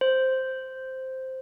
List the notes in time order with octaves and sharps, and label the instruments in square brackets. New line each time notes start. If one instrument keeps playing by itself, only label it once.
[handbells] C5